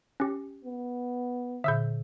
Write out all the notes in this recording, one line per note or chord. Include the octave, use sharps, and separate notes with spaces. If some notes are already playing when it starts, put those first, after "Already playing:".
C#4 G4
B3
A#2 D3 E5 E6 G6